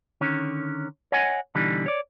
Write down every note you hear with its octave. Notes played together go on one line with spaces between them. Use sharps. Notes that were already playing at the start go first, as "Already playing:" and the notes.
D3 D#3 C#4 C#5
C#5 D#5 F#5 G#5
B2 D3 E3 G3 D#4
C#5 D5